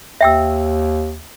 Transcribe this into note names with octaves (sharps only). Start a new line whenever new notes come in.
D#2 E5 G5 E6